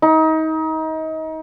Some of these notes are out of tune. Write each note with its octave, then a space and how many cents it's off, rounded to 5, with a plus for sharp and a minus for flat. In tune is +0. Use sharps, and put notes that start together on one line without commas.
D#4 +30